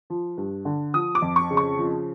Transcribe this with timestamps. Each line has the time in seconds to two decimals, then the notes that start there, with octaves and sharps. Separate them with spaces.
0.10 F3
0.37 G2
0.65 D3
0.94 F3 D#6
1.15 D6
1.22 F2
1.36 C#6
1.50 C#3
1.57 C#6
1.78 F3